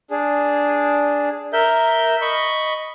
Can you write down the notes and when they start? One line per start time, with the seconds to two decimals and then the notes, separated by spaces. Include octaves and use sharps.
0.11 D4 G#4
1.53 A#4 E5 G6
2.21 D#5 B5 C#6